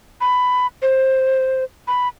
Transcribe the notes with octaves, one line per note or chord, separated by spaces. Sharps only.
B5
C5
B5